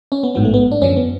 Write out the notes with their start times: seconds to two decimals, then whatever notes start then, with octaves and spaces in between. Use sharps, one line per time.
0.12 C#4
0.23 B3
0.35 A1 G#2 F#3 B3
0.45 A3
0.54 B3
0.72 D4
0.81 F#2 D3 F3 C#4
0.97 B3